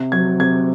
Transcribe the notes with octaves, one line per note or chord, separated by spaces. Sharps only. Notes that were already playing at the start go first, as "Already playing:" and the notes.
Already playing: C3
F#3 G#6
C3 G#6